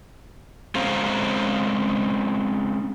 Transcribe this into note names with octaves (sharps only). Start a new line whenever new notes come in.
G#3 C4 C#4 C5 F5 A#5